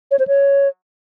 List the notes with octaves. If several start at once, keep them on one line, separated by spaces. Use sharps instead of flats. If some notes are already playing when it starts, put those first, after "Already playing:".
C#5
C5
C#5